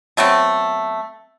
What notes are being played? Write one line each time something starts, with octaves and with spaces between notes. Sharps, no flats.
F#3 A3 B3 C4